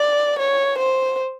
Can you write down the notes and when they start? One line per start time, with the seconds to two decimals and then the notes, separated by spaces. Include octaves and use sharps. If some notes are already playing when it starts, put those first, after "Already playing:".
Already playing: D5
0.39 C#5
0.79 C5